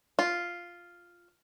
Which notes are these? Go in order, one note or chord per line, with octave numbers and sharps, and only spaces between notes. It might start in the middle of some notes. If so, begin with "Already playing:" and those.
F4